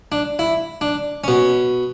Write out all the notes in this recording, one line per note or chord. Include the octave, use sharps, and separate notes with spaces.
D4
E4
D4
B2 C#4